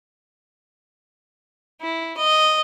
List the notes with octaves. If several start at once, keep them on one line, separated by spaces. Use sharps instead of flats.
E4
D#5